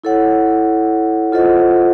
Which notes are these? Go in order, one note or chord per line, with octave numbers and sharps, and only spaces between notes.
E4 A4 C#5 F#5
F4 A4 C5 D#5 F#5